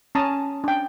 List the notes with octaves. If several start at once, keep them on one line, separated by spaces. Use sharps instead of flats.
C#4 A5 A#5 D#6
D4 G5